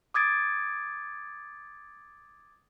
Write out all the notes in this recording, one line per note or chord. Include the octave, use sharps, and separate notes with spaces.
D6 D#6 G#6 A6 D7